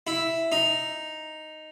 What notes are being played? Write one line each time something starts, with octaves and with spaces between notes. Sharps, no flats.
E4
D#4